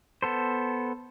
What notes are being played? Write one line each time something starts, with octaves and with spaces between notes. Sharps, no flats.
B3 A4 C5